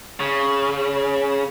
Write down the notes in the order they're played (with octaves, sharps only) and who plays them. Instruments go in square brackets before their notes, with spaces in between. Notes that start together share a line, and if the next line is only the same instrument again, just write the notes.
[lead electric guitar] C#3